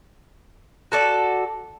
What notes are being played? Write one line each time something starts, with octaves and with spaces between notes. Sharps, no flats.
F#4 A4 D5